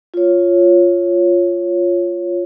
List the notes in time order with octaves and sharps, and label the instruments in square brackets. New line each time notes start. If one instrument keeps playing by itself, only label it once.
[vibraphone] F4 C#5